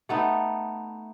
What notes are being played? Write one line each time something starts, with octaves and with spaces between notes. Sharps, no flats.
A3 B3 D#4